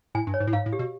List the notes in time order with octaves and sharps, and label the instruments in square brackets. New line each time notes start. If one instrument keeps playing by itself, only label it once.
[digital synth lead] A2 [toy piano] G#5
[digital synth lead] G2
[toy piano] C#5
[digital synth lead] G#2
A2
[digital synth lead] G#2 [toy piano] F5
[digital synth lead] A2
[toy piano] G4
[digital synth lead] B2